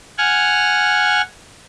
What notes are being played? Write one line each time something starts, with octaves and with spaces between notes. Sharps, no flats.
F#5 G#5 F6